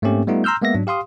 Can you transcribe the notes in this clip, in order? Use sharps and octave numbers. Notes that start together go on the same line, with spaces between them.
G#2 A3 A#3 C4 C#4 G4
G3 A3 B3 D#4 F4
A#5 C6 E6 F6 G6
G#3 A#3 B3 E5 A#6
G#2 F#3 D4
G4 F5 C6 D#6